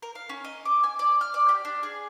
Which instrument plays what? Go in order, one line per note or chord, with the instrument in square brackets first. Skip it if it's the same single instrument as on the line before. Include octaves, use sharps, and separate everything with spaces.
[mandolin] A#4
F5
C#4
D#5
D6
G#5
D5
F6
D5
G4
D4
G#4